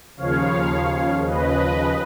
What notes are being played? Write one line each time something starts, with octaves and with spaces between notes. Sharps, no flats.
D#2 C#3 F3 C#5 F5
B4 D#5